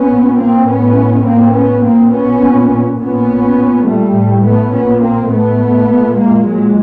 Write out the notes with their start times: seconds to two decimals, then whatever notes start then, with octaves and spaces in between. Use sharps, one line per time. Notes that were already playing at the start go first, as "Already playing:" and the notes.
Already playing: B3 C#4
0.09 A#2
0.38 A#3 C4
0.67 A2 B3 C#4
1.24 A2 A#3 C4
1.53 B3 C#4
1.82 A#2 A#3 C4
2.12 B3 C#4
2.40 A#2
2.98 A#2 B3 C#4
3.56 A#2
3.85 G3 A3
4.14 A2
4.43 A3 B3
4.72 A#2 B3 C#4
5.01 A#3 C4
5.30 A2 A3 B3
5.88 A#2
6.17 G#3 A#3
6.46 A#2 F#3 G#3